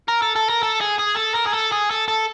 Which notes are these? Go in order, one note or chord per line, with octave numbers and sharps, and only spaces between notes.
A#4
A4
A4
A#4
A4
G#4
G#4
A4
A#4
G#4
A4
G#4
A4
A4